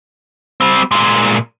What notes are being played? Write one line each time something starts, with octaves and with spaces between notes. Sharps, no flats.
G3 C4
A#2 G#3